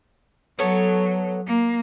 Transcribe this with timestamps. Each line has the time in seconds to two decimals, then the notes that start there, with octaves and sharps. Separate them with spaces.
0.59 F#3 B3 A4 C#5
1.47 A#3